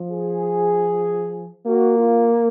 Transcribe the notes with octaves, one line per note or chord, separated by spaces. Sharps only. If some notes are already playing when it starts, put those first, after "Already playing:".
Already playing: F3
G#4
A#3 F#4
F4